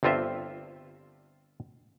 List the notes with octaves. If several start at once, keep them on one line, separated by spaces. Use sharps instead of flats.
G1 G2 C4 F4 C5 E5